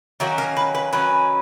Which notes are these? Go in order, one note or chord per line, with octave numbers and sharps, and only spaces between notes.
D#3 F#3 A#3 C#4 F#4
A#4
B4
B4
D#3 F#3 C#4 B4